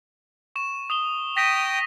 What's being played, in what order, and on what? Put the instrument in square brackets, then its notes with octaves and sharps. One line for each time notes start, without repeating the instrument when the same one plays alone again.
[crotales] C#6 E7
D#6 E7 G7
[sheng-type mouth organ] G5 D#6 [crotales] A#6 B6 D#7